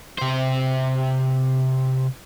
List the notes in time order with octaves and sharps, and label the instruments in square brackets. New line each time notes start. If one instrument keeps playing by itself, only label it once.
[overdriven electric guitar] C3 C5